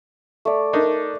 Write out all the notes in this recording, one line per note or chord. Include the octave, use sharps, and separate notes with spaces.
A3 D5
D4 D#4 A#4